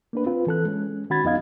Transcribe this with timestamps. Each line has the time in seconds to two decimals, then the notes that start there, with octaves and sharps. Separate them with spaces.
0.13 A#3 D4 B4
0.26 C4 F4 B4
0.47 E3 A4 F#6
0.65 G#3 C#4
1.10 D#3 C#4 F#4 B5 G#6 A6
1.24 F2 B3 D#4 D#5 F5 G#6